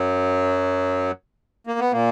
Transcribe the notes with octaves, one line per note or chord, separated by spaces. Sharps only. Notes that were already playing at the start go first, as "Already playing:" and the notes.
Already playing: F#2 F#3
A#3
B3
A#2 A#3